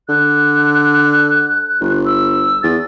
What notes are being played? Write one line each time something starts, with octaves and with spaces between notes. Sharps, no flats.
D3 F#6
G1
E6
E2 A6